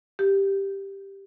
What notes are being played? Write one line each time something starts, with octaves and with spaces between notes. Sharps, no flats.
G4